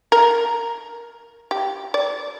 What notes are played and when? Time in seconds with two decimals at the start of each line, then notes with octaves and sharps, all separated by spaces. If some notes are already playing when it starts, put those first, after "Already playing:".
0.12 A#4
1.51 G4
1.94 D5